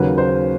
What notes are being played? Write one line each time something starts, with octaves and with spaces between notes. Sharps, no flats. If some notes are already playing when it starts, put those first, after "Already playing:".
Already playing: D#2 C#3 F#3 A#3 B4
C5